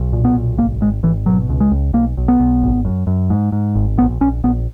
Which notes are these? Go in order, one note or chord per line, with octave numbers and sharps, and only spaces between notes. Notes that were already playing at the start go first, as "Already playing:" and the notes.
Already playing: B1
A#2
B3
B1
G#1 A#3
G#1 G#3
G#1 E3
B2 F#3
C#2
G#3
C#2
B1 A#3
B1
B3
B1
G#1
F#2
F#2
G#2
G#2
G#1
A#1 B3
A#1 C#4
A#1 B3